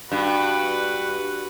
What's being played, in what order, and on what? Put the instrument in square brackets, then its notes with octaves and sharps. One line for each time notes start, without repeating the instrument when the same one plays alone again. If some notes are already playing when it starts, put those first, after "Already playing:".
[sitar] G2 [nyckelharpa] F#4 B4